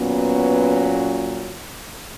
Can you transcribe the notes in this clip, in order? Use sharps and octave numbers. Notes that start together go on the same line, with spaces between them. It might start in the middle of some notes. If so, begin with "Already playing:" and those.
Already playing: A#2 F#3 B3 C#4 B4